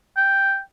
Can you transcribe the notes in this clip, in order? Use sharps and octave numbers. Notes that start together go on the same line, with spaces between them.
G5